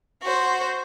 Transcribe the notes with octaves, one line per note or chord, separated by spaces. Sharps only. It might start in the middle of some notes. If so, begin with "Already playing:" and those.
F#4 C5